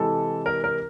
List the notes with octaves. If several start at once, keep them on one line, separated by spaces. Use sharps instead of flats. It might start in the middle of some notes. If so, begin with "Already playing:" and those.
Already playing: C3 E3 G#3 A4
A#4
A#4